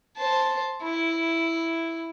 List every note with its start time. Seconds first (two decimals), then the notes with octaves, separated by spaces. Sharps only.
0.17 C5 A5
0.83 E4